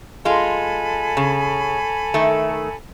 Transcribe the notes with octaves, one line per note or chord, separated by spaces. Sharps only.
G#3 F4 A4 G#5 B5
C#3
D#3 A3